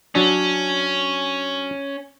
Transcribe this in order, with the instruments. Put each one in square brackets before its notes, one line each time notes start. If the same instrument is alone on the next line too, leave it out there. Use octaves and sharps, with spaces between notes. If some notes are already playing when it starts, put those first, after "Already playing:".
[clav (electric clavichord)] F#3 D4 [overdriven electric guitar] C#4